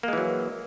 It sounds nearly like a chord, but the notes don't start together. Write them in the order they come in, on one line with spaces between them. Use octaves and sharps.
A#3 G#3 E3 F#3